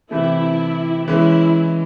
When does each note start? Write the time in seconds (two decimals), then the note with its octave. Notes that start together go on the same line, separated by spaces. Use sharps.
0.10 C3 E3 A3 E4
1.08 E3 G#3 C#4 E4